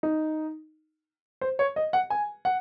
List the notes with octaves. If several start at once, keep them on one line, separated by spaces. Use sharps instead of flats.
D#4
C5
C#5
D#5
F#5
G#5
F#5